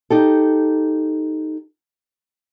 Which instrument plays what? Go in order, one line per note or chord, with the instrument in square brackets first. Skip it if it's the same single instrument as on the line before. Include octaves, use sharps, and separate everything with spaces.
[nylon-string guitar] D#4 G4 A4